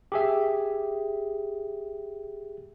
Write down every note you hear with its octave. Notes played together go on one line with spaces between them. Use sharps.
G4 G#4 E5